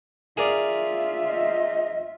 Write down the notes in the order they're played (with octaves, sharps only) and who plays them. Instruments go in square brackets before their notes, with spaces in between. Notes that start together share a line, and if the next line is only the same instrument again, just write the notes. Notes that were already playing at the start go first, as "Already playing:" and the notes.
[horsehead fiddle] F4 E5 [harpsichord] G#4 A#4 D5
[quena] D#5